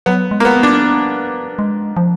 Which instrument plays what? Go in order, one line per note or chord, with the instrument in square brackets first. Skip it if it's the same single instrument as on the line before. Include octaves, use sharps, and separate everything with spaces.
[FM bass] F#3 [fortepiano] B3
[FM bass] G#3
[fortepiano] A#3
B3
[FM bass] B3
[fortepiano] D4
[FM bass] G#3
F3